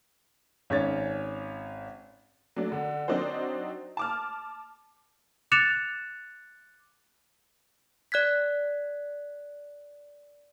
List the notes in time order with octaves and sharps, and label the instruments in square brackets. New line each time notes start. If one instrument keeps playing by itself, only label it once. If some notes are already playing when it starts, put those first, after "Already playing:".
[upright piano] G#1 C#4 C#5 A6
[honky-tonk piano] F#3 A3 C#4 D4
D3
F#3 C4 D4 D#4 F#4 C5
A5 D6 F6
[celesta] D6 F#6 A6 C#7 E7 F7
[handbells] D5 F#6 G#6 B6